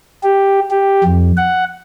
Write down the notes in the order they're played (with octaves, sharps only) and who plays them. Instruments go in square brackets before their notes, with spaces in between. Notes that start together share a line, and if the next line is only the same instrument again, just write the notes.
[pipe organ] G4
G4
F2
F#5